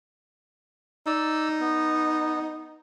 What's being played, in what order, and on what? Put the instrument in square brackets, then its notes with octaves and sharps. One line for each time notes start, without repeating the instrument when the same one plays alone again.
[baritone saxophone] D#4 [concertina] D5 E6
[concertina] B3